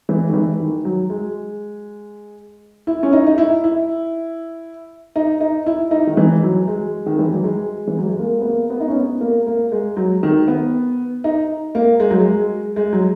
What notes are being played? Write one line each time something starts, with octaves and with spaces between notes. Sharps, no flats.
E3
D#3
E3
D#3
F#3
G#3
E4
C#4
D#4
D#4
E4
E4
D#4
D#4
E4
D#4
D#3
E3
F#3
G#3
D#3
E3
F#3
G#3
E3
F#3
G#3
A#3
B3
A#3
B3
D#4
C#4
B3
A#3
A#3
G#3
F#3
D#3
B3
D#4
A#3
G#3
F#3
G#3
G#3
F#3